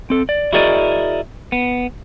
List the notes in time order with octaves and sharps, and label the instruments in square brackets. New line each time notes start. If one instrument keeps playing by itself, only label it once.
[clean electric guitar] C4 A4
D5
E4 F#4 G#4 A#4 D5 D#5
B3